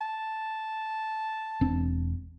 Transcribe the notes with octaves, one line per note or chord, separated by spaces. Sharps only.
A5
E1 C4 D4